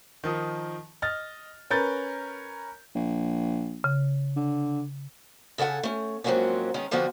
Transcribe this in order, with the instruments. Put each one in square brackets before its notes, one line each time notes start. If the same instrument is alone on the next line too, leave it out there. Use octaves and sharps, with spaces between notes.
[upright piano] D#3 F3 D#4
D#5 F6 A6
C#4 A#4 B4 G6 A6
[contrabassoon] A#1
[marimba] C#3
[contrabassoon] D3
[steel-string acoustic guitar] C#3 A4 C#5 F#5 G#5
A3 C#4
G#2 F3 F#3 A#3 C4 C#4
D#3 G#3 B3 C#4
D3 F3 B3 C4 D4 F#4